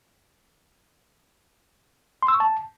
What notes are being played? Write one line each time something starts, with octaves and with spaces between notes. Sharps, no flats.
C6
E6
C#6
A5